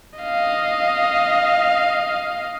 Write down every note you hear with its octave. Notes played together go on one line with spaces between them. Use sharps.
D#5 F5